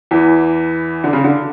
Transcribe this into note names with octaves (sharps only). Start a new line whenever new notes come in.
E2 E3
D3
C#3
D3